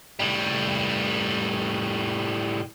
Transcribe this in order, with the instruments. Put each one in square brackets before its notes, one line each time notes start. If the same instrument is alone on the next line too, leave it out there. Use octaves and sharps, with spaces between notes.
[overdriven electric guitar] A2 G3